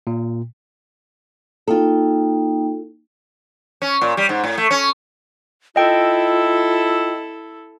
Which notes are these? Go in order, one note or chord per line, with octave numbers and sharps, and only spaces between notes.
A#2
A#3 D#4 F4 A4 G5
C#4
A#2
G3
G#2
A2
A3
C#4
E4 F4 A4 D#5 G5